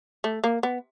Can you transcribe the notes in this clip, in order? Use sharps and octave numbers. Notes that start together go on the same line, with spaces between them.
A3
A#3
B3